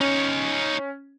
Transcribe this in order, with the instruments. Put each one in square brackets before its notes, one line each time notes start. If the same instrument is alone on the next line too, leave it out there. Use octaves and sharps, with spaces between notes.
[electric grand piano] C#4 [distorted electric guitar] D#4 C#5